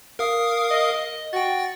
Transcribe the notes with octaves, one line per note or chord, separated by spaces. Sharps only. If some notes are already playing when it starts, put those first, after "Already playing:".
A#4 F5 D#6
D#5
F#4 G5 A6